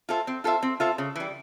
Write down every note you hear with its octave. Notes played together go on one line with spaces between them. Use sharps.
F4 A4 C5 E5
C4
F4 A4 C5 E5
C4
F4 A4 C5 E5
C#3
E3 G3